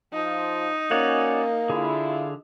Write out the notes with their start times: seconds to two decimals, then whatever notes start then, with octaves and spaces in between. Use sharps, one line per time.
0.13 F3 D#4 F4
0.91 A#3 C#4 F#4 C#5 D5
1.69 D3 E4 F4 G#4